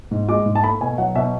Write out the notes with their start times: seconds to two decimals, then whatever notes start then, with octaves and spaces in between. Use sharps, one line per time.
0.11 G#2
0.29 G#3 D6
0.46 G#2
0.55 A5
0.63 A3 B5
0.81 B2 G#5
0.98 F#3 F#5
1.15 B2 E5